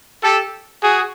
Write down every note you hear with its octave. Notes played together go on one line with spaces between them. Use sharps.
G4 A4
F#4 G#4